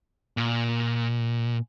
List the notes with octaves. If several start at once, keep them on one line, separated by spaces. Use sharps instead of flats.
A#2